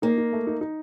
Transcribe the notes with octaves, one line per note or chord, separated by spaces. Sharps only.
A#3 D#4
D#4
A3
D#4
D#4